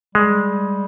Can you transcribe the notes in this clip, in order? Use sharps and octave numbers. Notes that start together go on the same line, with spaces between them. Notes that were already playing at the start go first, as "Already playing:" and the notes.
G3 G#3